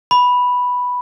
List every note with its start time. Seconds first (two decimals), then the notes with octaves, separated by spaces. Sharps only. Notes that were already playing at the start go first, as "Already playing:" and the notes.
0.11 B5